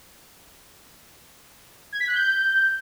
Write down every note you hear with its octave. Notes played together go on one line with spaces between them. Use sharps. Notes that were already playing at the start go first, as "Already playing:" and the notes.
G#6
B6
F#6
G6